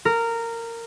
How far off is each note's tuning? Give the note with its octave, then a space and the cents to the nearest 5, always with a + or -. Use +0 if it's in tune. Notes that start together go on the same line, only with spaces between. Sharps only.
A#4 -15